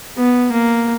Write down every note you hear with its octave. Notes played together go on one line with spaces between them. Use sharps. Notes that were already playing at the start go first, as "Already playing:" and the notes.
B3
A#3